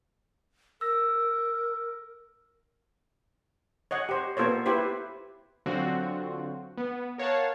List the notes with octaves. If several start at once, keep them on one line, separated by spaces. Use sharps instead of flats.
A#4 E6 A#6
C#5 D#5 F#5
G4 C5
A#3 B3 F4 A4 C5 C#5
E4 G4 B4 C5
D3 F#3 C4 F4 F#4
B3
A#4 C#5 F5 F#5 A5